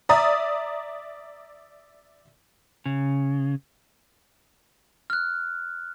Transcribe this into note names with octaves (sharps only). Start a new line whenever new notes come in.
D5 E5 A#5 D#6 A6
C#3
F6 F#6